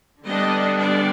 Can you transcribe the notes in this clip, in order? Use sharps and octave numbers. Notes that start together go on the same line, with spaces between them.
D3 G3 B3 D4 D#5
D5